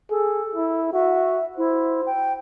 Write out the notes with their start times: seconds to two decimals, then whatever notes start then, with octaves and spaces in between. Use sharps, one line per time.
0.10 G#4 A4
0.55 E4
0.93 F#4 E5
1.57 E4 C5
2.06 G5